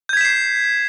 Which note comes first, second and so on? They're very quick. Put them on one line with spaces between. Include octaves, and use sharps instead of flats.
G6 G#6 B6 E7 C7